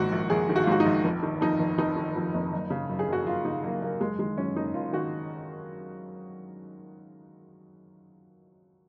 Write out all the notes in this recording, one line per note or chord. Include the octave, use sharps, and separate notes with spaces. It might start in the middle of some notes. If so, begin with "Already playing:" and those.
Already playing: A#1 G#2 D#3 F#4
A#1
A#1 G#4
D#3
F#4
F4
G#2 F#4
D#4
A#1
F1
D#3
F2 D#4
F1
F1 D#4
D#3
F2
F1
F#1
C#3
F#2
G#4
F#1
F#4
F#1 F4
C#3 D#4
F#2 A#3
F#1 A#3
F#1 G#3
D#3 G#3
F#2 C#4
F#1 D#4
F#1 F4
D#3 F#4